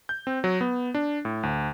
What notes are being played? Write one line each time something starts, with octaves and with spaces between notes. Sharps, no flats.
G6
C4
F#3
B3
D4
A2
D2